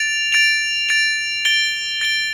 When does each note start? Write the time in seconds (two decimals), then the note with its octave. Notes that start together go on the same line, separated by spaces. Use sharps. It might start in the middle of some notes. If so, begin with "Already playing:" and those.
Already playing: A6 D7 F7
0.32 A6 D7 F7
0.89 A6 D7 F7
1.45 A6 D7 G7
2.01 A6 D7 G7